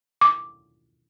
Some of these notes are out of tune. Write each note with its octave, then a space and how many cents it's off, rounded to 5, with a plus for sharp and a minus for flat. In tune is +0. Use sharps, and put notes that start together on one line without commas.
D6 -5